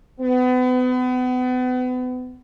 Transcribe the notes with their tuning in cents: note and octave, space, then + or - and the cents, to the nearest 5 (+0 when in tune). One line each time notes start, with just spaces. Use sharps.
B3 +35